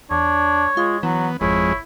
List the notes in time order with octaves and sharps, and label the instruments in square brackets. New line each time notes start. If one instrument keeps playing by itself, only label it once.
[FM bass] E2 [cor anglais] D4 [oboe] C#5
[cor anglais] G#3 [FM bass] F4
[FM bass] E3 [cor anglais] F#3 [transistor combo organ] B3
[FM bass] G#1 [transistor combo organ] F2 G#3 [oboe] E4 [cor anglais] C#5